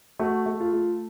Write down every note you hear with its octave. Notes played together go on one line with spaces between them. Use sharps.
A3 F#4
A3
F4
A3